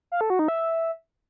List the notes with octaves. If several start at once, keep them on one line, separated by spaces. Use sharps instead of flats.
F5
A4
F#4
D#4
E5